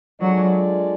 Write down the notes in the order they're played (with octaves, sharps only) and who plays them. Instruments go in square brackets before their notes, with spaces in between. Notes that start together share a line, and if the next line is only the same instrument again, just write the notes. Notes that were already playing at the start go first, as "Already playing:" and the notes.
[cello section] F#3 [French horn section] G#3 D4 F4 A4 D5